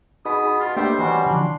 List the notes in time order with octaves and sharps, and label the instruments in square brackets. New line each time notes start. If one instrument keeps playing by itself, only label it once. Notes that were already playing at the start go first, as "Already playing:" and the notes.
[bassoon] B2 [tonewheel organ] D#4 G#4 B5 [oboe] D#6
[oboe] F4
[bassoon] G3 [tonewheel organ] A3 A#3 D4 [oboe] C5 [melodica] E5 G5
[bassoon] B2 [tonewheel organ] E3 [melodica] G3 C#4 F#4
[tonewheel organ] D3 E3 F3 [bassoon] D4 [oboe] C6